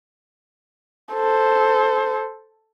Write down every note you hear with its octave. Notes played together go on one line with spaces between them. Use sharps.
A4 C5